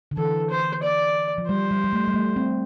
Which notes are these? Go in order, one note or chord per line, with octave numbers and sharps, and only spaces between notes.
D3
E3 A4
C5
D5
F3
G3 C5
G3
G3
A3
G3
A3
C4